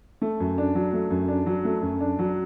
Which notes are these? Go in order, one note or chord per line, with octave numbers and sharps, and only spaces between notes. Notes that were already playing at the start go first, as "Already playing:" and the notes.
A3
F#2
D4
F#3
A3
F#2
D4
F#3
A3
F#2
D4
F#3